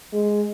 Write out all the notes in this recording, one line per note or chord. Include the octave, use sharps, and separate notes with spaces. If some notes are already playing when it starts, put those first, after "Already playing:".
G#3